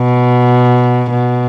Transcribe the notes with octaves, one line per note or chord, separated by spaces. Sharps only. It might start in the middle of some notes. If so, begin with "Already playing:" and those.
Already playing: B2
B2